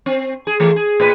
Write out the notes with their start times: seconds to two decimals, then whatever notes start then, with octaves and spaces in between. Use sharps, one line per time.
0.06 C4
0.47 G#4
0.60 E3 A3
0.76 G#4
1.00 A2 B4